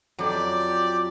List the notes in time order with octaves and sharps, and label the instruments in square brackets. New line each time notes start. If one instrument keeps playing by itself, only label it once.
[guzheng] F2 F#3 [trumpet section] G4 D5